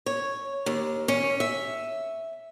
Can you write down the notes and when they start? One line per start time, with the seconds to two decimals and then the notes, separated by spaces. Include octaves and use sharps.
0.06 C#5
0.66 D#2
1.08 C#4
1.40 E5